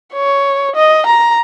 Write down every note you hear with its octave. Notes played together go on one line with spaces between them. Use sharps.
C#5
D#5
A#5